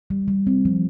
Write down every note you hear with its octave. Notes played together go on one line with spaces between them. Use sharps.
G3
G3
C4
F3